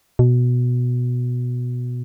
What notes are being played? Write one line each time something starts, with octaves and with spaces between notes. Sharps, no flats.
B2